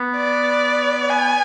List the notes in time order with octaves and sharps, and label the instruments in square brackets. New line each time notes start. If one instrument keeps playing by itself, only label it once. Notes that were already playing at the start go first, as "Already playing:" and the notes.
Already playing: [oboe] B3
[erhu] D5
[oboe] B3 [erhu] G#5